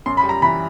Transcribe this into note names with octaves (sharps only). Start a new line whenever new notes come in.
F#2 C6
B5
G3
A#5
E3 B5